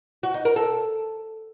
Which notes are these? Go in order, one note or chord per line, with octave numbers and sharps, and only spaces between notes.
F#4
D#4
A#4
A4